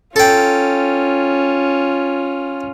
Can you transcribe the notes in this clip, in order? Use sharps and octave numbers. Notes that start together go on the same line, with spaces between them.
C#4 F4 A4 G5